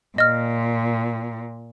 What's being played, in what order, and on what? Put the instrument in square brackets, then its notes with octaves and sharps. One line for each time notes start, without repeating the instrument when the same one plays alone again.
[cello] A#2 [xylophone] D#5 F6